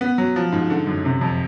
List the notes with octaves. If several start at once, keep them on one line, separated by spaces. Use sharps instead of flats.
B3
F#3
F3
G#2
D3
F#2
C3
F2